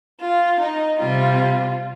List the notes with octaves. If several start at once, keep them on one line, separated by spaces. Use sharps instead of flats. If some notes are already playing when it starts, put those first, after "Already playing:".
F4
D#4
C3 G3 F4